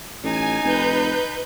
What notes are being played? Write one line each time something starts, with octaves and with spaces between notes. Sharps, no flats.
A1 D#4 G#5
F1 B4 G6